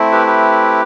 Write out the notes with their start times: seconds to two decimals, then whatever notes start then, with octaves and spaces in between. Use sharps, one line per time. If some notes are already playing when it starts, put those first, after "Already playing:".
Already playing: A3 C4 E4
0.12 G4 B4
0.27 G4 B4